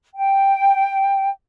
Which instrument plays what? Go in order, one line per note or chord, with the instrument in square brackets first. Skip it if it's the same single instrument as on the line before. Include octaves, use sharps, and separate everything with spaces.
[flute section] G5